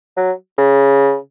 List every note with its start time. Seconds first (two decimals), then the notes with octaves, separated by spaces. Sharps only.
0.17 F#3
0.58 C#3